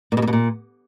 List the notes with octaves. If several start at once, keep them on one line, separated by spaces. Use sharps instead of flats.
A#2
B2
A#2
B2
A#2